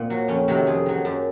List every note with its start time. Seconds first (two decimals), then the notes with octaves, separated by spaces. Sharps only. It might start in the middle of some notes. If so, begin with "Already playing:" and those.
Already playing: A#2 C4
0.10 F#3
0.28 F2 C#4
0.48 C3 D#3 F#3
0.67 F2 G#4
0.86 D#3 F#3
1.05 F#2